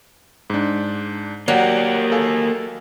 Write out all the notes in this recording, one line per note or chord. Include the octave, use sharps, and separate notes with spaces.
G#2 D4
F#3 A#3 G4 D5 F#5
A4 F5 G#5